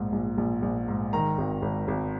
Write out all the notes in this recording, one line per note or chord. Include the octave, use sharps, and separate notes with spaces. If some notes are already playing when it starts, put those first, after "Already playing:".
Already playing: A#1 G#2
A#1
A#1
A#1
G#2
D#3 A#5
G#1
G#1
G#1